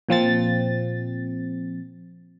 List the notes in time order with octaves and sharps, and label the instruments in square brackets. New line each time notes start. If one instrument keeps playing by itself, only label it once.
[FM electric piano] A#2 F3 C4 A6